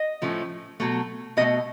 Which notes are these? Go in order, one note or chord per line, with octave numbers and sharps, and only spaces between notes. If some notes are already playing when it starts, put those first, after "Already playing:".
Already playing: D#5
A2 F3 A3 C#4
B2 F#3 A3
B2 F#3 A3 D#5